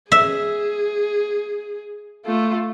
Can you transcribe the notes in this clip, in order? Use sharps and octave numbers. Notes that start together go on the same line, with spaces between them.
G#4 E5
A3 F4